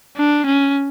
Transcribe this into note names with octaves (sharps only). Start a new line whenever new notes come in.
D4
C#4